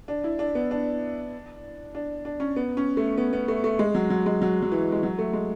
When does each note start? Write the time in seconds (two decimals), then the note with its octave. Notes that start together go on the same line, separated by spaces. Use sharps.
0.08 D4
0.24 E4
0.39 D4
0.55 B3
0.71 D4
1.95 D4
2.25 D4
2.40 C#4
2.56 B3
2.77 C#4
2.97 A3
3.18 B3
3.33 B3
3.48 A3
3.64 A3
3.79 G#3
3.95 F#3
4.10 F#3
4.26 G#3
4.42 F#3
4.62 F#3
4.72 E3
4.92 G#3
5.03 F#3
5.18 A3
5.33 G#3